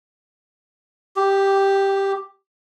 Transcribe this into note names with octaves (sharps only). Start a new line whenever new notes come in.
G4